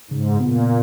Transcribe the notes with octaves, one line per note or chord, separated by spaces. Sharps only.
G#2 C#3
A#2 B3